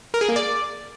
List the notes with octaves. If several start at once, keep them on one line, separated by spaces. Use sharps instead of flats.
A#4
G#4
A#3
D5